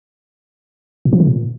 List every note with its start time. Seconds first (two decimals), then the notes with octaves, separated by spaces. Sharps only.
1.05 A#2
1.13 F3
1.20 D#3
1.27 A#2